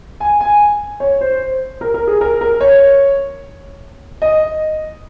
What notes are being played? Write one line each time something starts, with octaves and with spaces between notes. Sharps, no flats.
G#5
G#5
C#5
C5
A#4
A#4
G#4
A#4
A#4
C#5
D#5